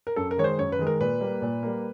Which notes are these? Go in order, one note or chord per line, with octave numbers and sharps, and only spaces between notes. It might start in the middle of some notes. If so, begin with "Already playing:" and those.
A#4
F#2 A4
A#4
D#3 G#3 C#5
C5
F#2 C#5
B4
D#3 G#3
A#4
A#2 B4
G3 A#3
A#2
G3 A#3